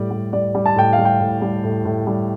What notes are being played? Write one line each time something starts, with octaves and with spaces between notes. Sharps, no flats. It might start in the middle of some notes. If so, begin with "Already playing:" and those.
Already playing: A2 G3 D5
G3
G3 D5
G3
A5
A2 G5
F5
G3
G5
A2
G3
A2
A2
G3